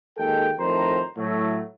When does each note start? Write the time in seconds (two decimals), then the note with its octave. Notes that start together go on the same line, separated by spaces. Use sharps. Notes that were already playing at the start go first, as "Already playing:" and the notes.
0.17 D#2 G#3 A4 G5
0.58 F2 A2 D#3 C5 A#5
1.17 A2 F#3 A3